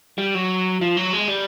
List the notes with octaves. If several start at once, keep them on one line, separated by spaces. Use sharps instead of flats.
G3
F#3
F3
F#3
G#3
G3